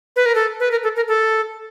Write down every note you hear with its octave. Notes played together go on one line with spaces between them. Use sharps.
B4
A#4
A4
B4
A#4
A4
A#4
A4